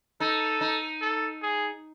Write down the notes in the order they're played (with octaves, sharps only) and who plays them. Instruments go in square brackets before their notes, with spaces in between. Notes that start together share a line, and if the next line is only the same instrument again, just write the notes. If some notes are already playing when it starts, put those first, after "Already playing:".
[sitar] D#4 [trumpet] A4
[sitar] D#4
[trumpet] A4
G#4